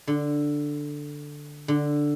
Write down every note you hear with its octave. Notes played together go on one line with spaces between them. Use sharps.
D3
D3